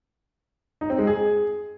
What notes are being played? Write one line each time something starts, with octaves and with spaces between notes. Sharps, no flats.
D#4
C4
G#3
G#4